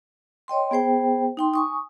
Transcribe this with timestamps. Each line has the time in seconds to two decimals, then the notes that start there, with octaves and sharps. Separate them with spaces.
0.48 C#5 D#5 G5 C6
0.71 B3 G#4 C5 G5
1.37 D#4 G5 C6
1.54 G#5 C#6 D#6